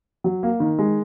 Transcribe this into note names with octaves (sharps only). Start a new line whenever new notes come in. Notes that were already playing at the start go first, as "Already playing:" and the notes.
F#3
A#3
D#3
G#3